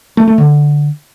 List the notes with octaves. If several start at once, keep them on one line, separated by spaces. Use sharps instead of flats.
A3
A3
D3